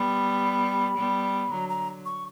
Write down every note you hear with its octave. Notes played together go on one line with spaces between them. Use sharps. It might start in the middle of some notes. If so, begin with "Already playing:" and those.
Already playing: G3 B3 B5
G3 B3
D3 F#3 A#5
A#5
C#6